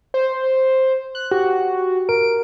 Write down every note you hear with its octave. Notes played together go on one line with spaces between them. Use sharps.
C5
F#6
F#4 G4
A#4 D7